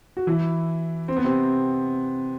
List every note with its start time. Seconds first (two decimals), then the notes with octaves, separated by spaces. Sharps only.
0.17 F#4
0.27 E3 E4
1.08 C4
1.17 B3
1.24 C3 C4